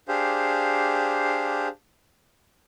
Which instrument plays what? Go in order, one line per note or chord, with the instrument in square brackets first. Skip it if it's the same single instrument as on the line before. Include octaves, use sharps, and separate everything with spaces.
[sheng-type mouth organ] D4 G4 G#4 C5 F5